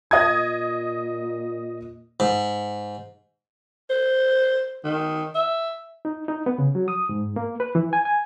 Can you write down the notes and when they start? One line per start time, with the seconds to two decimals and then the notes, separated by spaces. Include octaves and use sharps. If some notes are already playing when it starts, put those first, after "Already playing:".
0.11 A#2 D#5 D#6 G#6
2.20 G#2
3.90 C5
4.84 D#3
5.35 E5
6.05 D#4
6.28 D#4
6.46 B3
6.58 C#3
6.75 F#3
6.88 D#6
7.09 G#2
7.36 A#3
7.60 B4
7.75 E3
7.93 G#5
8.05 G#5